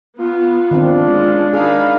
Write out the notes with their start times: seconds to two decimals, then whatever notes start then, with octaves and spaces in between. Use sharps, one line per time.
0.18 B3 F4
0.71 D#3 C4 D4
1.03 G#3 C#4
1.53 D#3 D#4 G#4 F5 B5